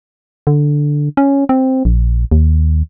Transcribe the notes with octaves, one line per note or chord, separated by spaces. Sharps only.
D3
C#4
C4
A#1
D#2